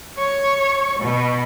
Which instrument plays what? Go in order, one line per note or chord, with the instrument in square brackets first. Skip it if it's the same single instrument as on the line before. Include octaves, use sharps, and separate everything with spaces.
[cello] C#5
B2